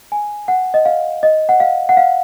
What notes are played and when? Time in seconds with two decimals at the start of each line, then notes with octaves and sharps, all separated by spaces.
0.12 G#5
0.48 F#5
0.74 D#5
0.86 F5
1.23 D#5
1.49 F#5
1.60 F5
1.89 F#5
1.97 F5